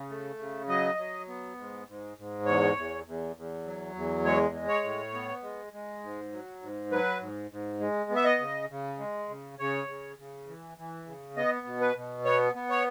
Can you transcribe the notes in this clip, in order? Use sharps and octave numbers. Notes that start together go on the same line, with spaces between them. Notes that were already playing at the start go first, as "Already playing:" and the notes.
Already playing: C#3
A3
C#3
F#3 D#5
F#3
B3
G#2
G#2
G#2
E2 C#5
E2
E2
E2
F#3
E2
G#3 C#5
G#3
C#5
A2
B3
G#3
G#3
G#2
F#3
G#2
F#3 B4
G#2
G#2
G#3
B3
E5
D#5
C#3
C#3
G#3
C#3
C#3 C#5
C#3
C#3
E3
E3
C#3
B3 D#5
B2
B4
B2
B3 C#5
B3
C#5